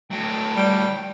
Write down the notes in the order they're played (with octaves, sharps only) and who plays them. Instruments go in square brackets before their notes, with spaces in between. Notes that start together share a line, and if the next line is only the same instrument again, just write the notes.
[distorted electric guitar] A2 F#3 [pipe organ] G5
[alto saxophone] G3